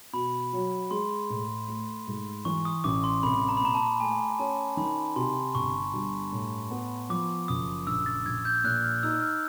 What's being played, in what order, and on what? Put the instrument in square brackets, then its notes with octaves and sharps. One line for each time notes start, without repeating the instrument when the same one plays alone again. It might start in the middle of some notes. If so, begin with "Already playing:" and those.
[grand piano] B2 [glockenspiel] B5
[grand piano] F#3
[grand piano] G#3 [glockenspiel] C6
[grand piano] A2
A3
G#2
[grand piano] E3 [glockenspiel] C#6
[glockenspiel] D#6
[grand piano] A1 [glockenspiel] D6
[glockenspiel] C6
[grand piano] C2 [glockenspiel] B5
[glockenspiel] A#5
B5
[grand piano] A#2 [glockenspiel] A#5
[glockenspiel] A5
[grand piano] A3 [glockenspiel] G#5
[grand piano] C#4 [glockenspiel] A5
[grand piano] D#3 [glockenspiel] B5
[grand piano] C3 [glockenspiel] C6
[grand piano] G1 [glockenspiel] C#6
[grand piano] G2
A2
B3
[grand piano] F3 [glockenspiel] D6
[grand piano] F#1 [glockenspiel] D#6
[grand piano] A#1 [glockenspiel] E6
[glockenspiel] A6
[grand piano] A#1 [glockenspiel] G#6
[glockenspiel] G6
[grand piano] A#2 [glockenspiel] F#6
[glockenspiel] F6
[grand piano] D#4 [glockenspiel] E6
[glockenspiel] F6